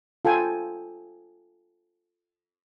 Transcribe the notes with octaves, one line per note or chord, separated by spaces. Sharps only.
F4 A4 G5 G#5